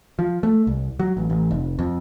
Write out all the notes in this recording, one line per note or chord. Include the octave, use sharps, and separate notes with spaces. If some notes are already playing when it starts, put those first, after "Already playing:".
F3
A3
C2
F#3
A1
A1
F1
F2